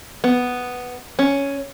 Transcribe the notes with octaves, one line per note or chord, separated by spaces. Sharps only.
B3
C#4